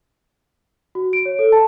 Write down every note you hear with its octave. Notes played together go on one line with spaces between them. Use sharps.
F#4
D7
C#5
A4
A5